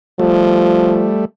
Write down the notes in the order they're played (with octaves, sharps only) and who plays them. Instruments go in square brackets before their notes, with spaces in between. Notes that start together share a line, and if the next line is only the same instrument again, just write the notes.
[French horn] F3 [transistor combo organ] G3 A3